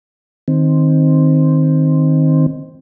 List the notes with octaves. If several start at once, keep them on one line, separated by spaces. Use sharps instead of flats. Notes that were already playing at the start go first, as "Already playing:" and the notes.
D#3 C4